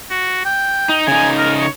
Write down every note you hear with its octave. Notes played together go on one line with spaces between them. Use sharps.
F#4
G5
D#4
C#3 D#4 G#5
A#4
C#5